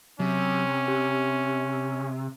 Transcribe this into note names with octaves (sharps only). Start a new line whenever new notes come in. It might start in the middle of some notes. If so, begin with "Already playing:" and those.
C3 F#3 C#4
G4